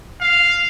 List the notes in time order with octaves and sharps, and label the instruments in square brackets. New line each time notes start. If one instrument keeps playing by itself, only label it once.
[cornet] F5